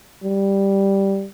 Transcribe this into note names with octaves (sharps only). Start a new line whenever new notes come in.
G3